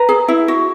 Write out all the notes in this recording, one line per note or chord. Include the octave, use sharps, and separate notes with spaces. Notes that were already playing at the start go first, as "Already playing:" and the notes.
Already playing: B4 A#5
G#4
E4
F#4